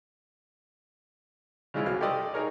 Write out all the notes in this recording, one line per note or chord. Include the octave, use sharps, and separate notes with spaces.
C#3 F3 G#3 E4 F4
C2 F#3 F6
G4 A4 C5 D5 D#5 G5
D#4 G#4 A#4 C#5